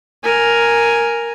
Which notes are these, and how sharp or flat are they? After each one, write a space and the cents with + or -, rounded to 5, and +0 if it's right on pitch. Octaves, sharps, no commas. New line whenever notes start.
A#4 +0 G#5 +0